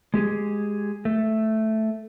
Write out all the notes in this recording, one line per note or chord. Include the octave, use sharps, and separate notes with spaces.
G#3 G4 G#4
A3